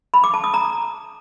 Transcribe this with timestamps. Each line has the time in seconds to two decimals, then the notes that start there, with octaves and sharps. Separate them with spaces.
0.14 B5
0.24 D6
0.34 A5
0.44 D#6
0.54 A#5